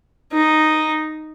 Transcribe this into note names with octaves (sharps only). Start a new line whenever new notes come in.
D#4